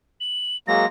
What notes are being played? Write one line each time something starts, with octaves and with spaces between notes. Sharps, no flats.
F#7
F#3 G#3 A#3 A#6